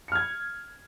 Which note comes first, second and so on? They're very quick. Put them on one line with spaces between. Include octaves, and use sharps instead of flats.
C#7 F6 G#6